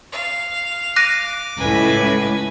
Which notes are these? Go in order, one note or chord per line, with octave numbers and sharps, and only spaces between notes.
F5
D6 F#6 A#6 D#7
C#2 A2 B4 G#5